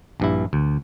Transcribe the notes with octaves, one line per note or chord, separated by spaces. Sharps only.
A#1 G2 E4
D2